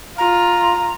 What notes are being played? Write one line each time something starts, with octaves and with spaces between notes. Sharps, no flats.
F4 A#5